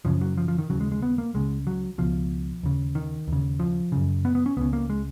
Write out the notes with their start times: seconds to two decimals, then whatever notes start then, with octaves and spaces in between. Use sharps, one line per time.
0.05 F#2 C#3 F3
0.21 F#3
0.37 F3
0.48 F3
0.58 D#3
0.70 D#2 C#3 F#3
0.81 G#3
0.92 G#3
1.02 B3
1.18 A#3
1.34 C#2 C#3 G#3
1.67 F#3
1.98 C#2 B2 F3
2.63 D#2 C#3
2.95 D#3
3.28 D#2 C#3
3.60 F3
3.92 F#2 C#3
4.25 B3
4.35 B3
4.46 C#4
4.57 C#2 C#3 B3
4.73 A#3
4.90 G#3